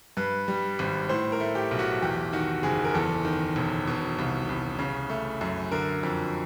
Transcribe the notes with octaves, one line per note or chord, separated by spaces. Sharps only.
G2 B4
G3
G#1
A2 C5
A#4
A3
G4
B1
F#4
E2 G4
D#3 F#4
F#1 G#4
A#4
E2 A4
D#3
E1
B2
C2
C2
C#3
A3
F#2
D3 A#4
F2